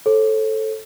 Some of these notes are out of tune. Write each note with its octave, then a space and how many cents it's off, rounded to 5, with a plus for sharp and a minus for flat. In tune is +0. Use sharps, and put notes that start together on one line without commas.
A4 -5 C#5 -45